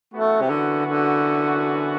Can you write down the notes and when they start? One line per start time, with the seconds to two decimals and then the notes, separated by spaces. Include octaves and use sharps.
0.14 F#2 E3 A3 B3 F#4
0.41 C3
0.50 D3
0.87 D3